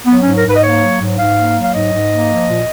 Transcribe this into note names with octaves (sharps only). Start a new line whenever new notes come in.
F#3 B3
G#2 C#4
A#4
G#2 B4
D#5
A#3 C#5
F#3
G#2
G#2 F5
A#3
F#3
F5
G#2 D#5
G#2
A#3
F3
A#2